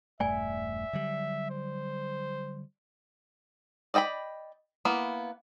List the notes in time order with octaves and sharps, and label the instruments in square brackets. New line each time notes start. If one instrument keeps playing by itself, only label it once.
[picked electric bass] E1 G2 A3 [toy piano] D5 G#5 [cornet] E5
[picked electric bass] D3 F#3 G3
[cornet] C5
[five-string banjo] D5 D#5 G5 A5 B5
A#3 B3 E4